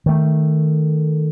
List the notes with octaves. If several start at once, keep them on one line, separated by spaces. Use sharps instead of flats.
D#3 A3